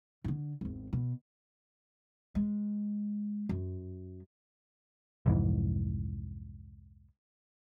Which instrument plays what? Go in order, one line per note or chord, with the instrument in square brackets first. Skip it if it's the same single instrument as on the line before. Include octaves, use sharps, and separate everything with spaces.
[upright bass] D3 D#3
G#1 E2
B2
G#3
F#2
[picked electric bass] C2 F2 G#2 E3